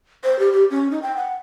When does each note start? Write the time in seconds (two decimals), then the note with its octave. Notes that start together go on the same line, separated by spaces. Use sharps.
0.24 C5
0.39 G4
0.53 G4
0.71 C#4
0.91 D#4
1.03 G5
1.17 F#5